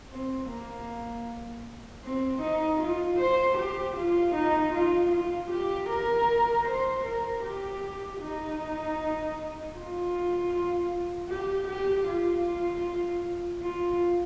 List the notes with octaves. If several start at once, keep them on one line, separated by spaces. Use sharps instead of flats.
C4
A#3
C4
D#4
F4
C5
G4
F4
D#4
F4
F4
G4
A#4
C5
A#4
G4
D#4
F4
G4
G4
F4
F4